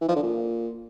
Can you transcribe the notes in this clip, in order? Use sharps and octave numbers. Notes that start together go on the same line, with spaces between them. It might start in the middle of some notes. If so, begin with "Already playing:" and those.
E3
F3
D3
A#2